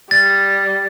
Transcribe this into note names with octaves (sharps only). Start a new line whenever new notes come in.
G3 A6